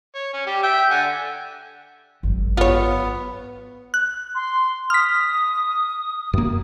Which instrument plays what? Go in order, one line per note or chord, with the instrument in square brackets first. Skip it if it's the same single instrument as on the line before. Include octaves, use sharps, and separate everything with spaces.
[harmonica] C#5
C#4
G3 G4
E5 G5
D3 F#5 G#5
[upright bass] G#1 F#2
[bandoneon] B3 [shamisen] F4 C#5
[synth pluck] F#6
[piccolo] C6
[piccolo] D#6 [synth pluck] F6 B6
[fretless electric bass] F#2 A#3